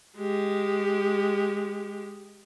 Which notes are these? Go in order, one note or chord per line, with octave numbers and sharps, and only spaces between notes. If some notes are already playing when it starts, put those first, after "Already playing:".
G#3 G4